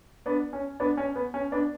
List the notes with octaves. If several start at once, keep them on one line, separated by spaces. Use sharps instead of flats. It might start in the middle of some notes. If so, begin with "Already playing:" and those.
B3 D4
C#4
B3 D4
C#4
B3
C#4
B3 D4